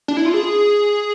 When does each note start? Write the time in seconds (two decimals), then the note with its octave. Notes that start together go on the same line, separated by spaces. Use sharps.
0.08 D4
0.17 E4
0.26 F4
0.34 G#4